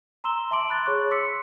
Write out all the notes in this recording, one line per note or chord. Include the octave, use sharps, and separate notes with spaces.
A#5 C6 E6 E7 G7
E5 A5 C6 D6 D7 F#7
B5 F#6 A6
G#4 C#5 C#6 F#6
C6 D6 E6 B6 C#7